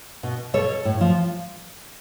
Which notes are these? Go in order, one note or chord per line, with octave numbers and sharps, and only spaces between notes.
B2
B2 A4 C#5
A2
F3